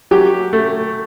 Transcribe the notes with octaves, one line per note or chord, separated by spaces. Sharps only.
F#3 G4
A3